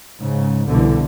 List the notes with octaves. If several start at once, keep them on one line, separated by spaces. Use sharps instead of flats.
G#2 C#3
C2 B2 D3 E3